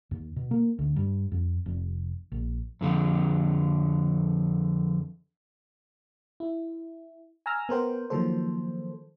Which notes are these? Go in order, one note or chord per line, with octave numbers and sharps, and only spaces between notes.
D#2
B2
A#3
D2
G2
F2
F1
A#1
F2 D3 F3
E4
G#5 A#5 E6 F6 A#6
B3 A#4 C5 G5
D#3 F3 F#3 A#3 A4 C5